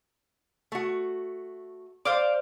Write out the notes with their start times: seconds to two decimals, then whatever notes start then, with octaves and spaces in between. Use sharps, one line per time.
0.72 A3 F#4
2.05 C5 D5 F5 D6